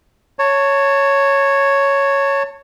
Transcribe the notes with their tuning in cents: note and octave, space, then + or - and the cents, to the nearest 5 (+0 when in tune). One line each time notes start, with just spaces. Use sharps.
C#5 +0 A5 +35